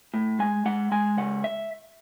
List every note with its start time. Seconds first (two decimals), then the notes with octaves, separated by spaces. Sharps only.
0.14 A2
0.39 G#3 G#5
0.65 G#3 F#5
0.92 G#3 G#5
1.17 C#3 F#5
1.44 E5